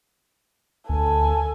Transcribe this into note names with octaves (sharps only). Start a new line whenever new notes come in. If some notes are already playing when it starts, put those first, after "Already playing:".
D2 A4 G#5